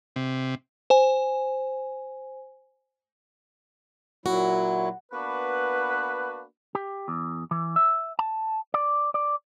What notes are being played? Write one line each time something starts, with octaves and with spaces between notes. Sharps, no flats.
C3
C5 G#5
A#2 F#3 E4 F#4
A#3 B3 D4 F#4 B4
G4
E2
E3
E5
A5
D5
D5